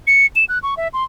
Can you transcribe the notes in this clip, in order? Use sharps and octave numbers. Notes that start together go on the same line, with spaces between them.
C#7
E7
F#6
C#6
E5
C6